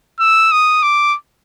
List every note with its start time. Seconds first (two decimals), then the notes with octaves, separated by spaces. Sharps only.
0.20 E6
0.52 D#6
0.83 D6